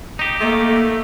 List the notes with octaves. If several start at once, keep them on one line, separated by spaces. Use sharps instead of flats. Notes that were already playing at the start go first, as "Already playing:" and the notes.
D#4 G4
A3 A#3